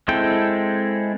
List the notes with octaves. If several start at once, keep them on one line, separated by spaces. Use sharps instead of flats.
G#3 C4 E4 A4 G5